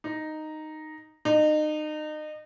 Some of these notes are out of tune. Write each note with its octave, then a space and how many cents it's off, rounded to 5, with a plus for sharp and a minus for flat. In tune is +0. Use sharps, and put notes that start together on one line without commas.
D#4 -5
D#4 -30